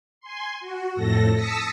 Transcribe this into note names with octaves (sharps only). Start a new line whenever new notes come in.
G#5 C6
F#4
F2 A2 A4 A#6
A5 D#6 E6 A#6 B6 C#7